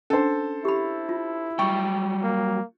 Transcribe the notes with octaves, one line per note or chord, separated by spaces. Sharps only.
C#4 D4 A4 C5
E4 G4 B5
F4
F#3 G3 G5 C#6
A#3